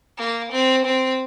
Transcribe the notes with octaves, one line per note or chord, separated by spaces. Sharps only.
A#3
C4
C4